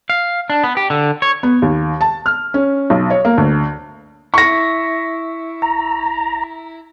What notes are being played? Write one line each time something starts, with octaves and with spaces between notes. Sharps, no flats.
F5
D4
B3
G4
D3
C#5
B3
D#2
A5
F6
C#4
B1
C#5
A#3
D2
E4 C#6 A#6
A#5